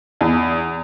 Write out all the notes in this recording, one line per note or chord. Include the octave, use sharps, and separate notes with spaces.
E2